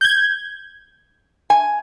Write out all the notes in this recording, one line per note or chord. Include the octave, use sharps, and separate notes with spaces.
G6 G#6
G#5